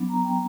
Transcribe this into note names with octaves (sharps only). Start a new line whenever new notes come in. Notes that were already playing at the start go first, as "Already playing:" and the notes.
Already playing: F#3 B3 D4
A#5
G5